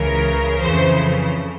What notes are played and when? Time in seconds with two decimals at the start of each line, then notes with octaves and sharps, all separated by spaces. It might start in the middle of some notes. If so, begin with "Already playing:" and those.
Already playing: C#2 C#3 E3 A#4
0.61 F2 C#3 E3 C5